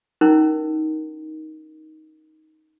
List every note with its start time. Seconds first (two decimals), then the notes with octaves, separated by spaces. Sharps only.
0.21 C#4 D#4 E4 A#4